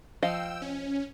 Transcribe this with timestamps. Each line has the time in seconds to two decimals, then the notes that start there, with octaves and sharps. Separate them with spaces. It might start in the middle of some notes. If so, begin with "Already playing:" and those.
0.23 F3 D#5 F5 G5 E6
0.62 C#4